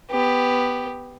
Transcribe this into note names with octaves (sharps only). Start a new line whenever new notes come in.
B3 G4